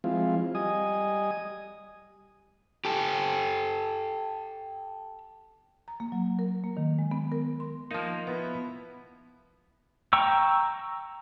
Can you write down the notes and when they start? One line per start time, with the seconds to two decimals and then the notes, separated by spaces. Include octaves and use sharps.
0.04 F3 G#3 C4 E4 F4
0.55 G3 D#5 G#5 D#6
2.85 G4 A4
5.88 A#5
6.00 A#3
6.12 F#3
6.39 A#4
6.64 A#3
6.77 D#3
6.99 G#3
7.11 B3
7.32 A#4
7.60 C6
7.91 F3 A#3 D#4
8.27 B3 E4
10.13 G5 A#5 C#6 E6